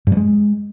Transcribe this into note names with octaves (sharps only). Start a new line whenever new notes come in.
G2
G3
G#3